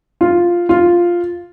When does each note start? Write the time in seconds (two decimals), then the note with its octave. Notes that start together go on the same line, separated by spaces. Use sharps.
0.21 F4
0.69 F4